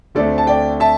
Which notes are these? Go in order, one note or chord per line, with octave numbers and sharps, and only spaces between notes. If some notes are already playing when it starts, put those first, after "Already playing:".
D2 D3 A3 C4 A4 D5
A5
D5 G5
E5 A5